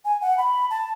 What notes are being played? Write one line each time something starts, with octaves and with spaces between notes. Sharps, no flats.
G#5
F#5
B5
A5